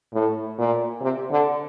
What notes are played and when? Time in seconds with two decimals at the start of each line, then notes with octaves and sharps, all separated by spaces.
0.13 A2
0.58 A#2
1.01 C3
1.31 D3